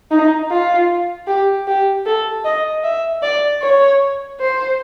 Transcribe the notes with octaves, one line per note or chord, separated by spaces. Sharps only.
D#4
F4
G4
G4
A4
D#5
E5
D5
C#5
C5